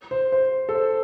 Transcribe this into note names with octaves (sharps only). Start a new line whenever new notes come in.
C5
C5
A4
C5